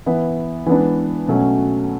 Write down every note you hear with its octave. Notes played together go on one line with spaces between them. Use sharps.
E3 B3 E4
E3 G#3 B3 D4
B2 F#3 A3 C#4